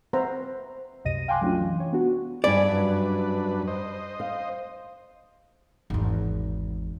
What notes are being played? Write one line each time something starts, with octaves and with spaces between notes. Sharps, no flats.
C4 B4 C5 E5 F#5 A#5
C2 F#2 C3 D#5 A#6 D#7
F5 G5 G#5 C6 D6 F#6
F#3 A3 C#4 D4 F4
E3
C#5
B3 D4 F#4
E2 G2 D5 G#5 B5
F#2 D4 B4
C5 D#5
F5
G#1 E2